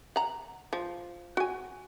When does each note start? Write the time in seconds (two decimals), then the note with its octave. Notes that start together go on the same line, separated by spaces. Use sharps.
0.16 F#5 A#5
0.73 F3
1.37 F#4 G#5